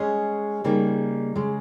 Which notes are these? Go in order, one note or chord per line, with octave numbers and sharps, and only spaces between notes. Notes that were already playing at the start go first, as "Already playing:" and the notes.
Already playing: G#3 C#4 G#4 D#5
C#3 G3 A#3 D#4
C#3 G#3